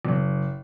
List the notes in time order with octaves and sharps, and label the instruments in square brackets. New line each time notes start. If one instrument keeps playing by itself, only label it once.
[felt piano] F#1